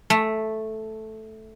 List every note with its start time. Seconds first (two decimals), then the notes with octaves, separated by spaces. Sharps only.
0.10 A3